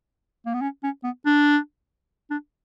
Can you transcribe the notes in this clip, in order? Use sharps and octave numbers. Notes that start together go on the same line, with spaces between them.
A#3
B3
C#4
C#4
B3
D4
D4